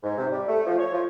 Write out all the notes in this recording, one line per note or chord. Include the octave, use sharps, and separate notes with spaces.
G#2
C3
G3
A3
F3
C#5
F3